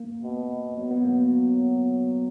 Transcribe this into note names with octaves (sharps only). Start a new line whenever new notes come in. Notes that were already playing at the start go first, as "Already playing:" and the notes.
Already playing: A#3
B2
F#3 B3
B3
A#3